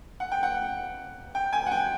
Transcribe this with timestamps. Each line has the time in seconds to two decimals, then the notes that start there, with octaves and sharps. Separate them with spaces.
0.20 F#5
0.32 G5
0.43 F#5
1.35 G5
1.53 G#5
1.66 F#5
1.72 G5